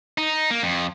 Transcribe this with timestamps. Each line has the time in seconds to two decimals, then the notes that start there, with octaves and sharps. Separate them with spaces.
0.18 D#4
0.51 A#3
0.63 F2